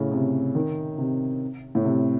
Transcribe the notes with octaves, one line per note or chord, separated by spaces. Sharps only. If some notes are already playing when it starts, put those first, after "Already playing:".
Already playing: A2 C#3
C3
D#3
C3
A2
C3